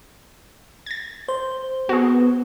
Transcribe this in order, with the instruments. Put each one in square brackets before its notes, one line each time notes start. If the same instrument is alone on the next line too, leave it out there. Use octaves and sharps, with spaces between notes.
[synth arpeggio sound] G#6 A6
[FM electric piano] C5
[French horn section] B3 [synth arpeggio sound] F#4 G#4